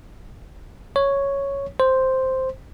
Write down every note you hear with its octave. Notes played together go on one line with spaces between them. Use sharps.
C#5
C5